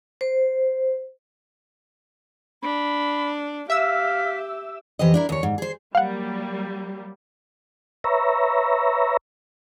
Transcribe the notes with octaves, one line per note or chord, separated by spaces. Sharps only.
C5
D4 B5
G4 E5 F5 E6 B6
F2 E3 G4 C5 D#5
D4 E4 A#4
D#2 C#5
G#2
G#4 C5
F#3 G3 A#3 F5 F#5
B4 C#5 E5 A#5